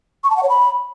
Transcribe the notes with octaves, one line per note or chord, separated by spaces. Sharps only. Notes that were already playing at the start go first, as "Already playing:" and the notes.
C#6
A5
F#5
C#5
B5